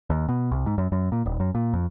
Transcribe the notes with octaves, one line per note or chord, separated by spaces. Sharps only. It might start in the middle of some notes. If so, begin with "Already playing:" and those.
D#2
B2
C2
G#2
F#2
F#2
A#2
D#1
F#2
A#2
F2